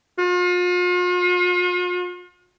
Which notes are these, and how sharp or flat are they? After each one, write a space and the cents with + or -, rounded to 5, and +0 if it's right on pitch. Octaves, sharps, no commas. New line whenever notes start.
F4 +40